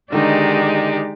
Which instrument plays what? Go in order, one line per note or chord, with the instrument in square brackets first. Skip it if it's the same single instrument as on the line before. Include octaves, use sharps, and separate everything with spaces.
[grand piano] D3 D#3 [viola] G#3 D#4 [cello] G4 D5